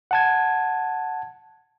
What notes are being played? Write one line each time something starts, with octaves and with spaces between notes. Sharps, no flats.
F#5 A5 G#6